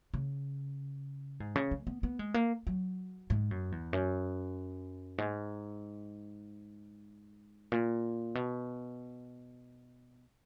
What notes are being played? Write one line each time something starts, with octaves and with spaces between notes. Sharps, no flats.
C#3
G#2
C#3
G#3
B3
B3
G#3
A#3
F#3
G#2
F#2
E2
F#2
G#2
A#2
B2